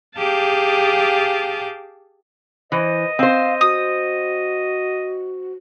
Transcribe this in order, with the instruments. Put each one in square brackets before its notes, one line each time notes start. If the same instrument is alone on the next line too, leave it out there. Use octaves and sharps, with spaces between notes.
[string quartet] G4 G#4 F5 A5 D6 G6
[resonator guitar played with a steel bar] E3 [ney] C5 [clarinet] D#5
[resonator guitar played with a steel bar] C4 C5 [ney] F5
[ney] F#4 [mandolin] D#6